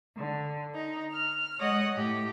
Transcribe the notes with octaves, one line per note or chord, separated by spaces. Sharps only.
D3
D#4
F6
G#3 C#5 D#5 F#5 D#6
A2 G4